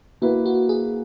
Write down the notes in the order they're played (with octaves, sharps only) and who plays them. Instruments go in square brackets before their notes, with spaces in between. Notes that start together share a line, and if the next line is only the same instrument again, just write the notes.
[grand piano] A#3 E4 B4 [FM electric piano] F#4
[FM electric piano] F#4
G#4